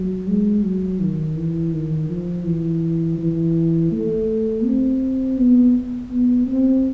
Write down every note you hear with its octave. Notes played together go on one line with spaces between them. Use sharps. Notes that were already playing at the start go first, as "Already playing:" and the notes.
Already playing: F#3
G#3
F#3
D#3
E3
D#3
F3
E3
E3
A3
C4
B3
B3
C4